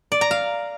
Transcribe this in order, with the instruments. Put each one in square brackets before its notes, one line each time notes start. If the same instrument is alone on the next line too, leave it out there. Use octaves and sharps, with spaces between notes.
[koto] D5
A#5
F5